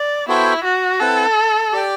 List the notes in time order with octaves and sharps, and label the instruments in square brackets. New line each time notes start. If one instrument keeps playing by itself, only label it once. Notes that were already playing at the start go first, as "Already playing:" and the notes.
Already playing: [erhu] D5
[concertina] B3 F#4 A4 C5 G5 [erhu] E4
[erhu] F#4
[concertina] C4 E4 B4 F#5 [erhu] A4
[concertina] G4 D5 G5